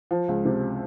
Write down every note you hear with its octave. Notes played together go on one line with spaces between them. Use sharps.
F3
C#2
C3